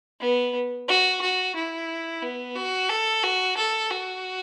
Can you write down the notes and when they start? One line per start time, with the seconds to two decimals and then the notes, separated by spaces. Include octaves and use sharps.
0.20 B3
0.88 F#4
1.21 F#4
1.55 E4
2.22 B3
2.55 F#4
2.89 A4
3.23 F#4
3.57 A4
3.90 F#4